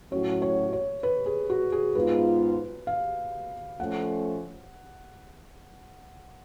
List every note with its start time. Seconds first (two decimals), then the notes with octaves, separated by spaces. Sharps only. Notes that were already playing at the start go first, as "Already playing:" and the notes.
0.12 A2 F#3 C#4 F#4 C#5
0.42 C#5
0.73 C#5
1.03 B4
1.26 G#4
1.50 F#4
1.72 G#4
1.95 G#2 G#3 B3 F4 B4
2.87 F5
3.79 F3 A3 C#4 F#5